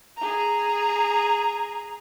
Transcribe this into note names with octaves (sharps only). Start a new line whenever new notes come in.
G#4 A#5